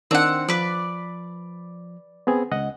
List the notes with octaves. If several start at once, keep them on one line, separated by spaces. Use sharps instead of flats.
D#3 C4 D4 F#5
F3 B4 D5
B3 C4 G#4
C#2 D#5 F#5